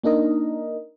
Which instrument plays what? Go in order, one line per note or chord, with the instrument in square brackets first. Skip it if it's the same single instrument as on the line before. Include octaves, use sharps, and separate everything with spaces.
[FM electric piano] A#3 D4 D#4 A#4 D#5